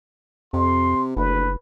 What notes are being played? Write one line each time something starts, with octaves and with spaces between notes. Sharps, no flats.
F2 C3 C6
F#1 D2 B4